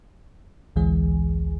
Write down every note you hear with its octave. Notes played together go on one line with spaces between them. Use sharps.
A1 D2 E3 G#3 G#4